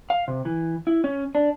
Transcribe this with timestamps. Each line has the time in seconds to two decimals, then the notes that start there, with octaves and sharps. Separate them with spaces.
0.10 F5
0.28 C3
0.45 E3
0.87 E4
1.04 C#4
1.35 D4